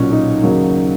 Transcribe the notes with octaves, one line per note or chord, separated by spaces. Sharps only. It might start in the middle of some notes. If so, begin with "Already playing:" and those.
Already playing: B1 A#2 F#3 C#4 D#4
D#4
D#2 C#3 F#3